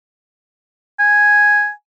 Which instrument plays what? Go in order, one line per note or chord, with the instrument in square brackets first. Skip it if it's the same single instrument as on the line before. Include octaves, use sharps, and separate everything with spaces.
[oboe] G#5